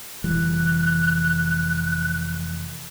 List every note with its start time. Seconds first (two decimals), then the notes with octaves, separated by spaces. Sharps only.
0.24 F1 E3 G3 F#6